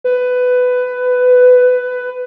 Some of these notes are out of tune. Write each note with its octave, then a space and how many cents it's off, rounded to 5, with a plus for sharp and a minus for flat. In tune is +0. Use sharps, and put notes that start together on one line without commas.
B4 +15